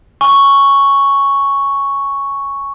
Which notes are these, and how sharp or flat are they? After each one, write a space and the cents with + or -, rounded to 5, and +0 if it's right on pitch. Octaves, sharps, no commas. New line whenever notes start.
G#5 +0 C#6 +0